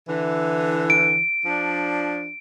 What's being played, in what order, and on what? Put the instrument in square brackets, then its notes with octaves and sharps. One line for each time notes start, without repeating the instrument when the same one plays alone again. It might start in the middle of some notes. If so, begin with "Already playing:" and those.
[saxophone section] D3 E3
[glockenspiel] D7
[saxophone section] F3 D4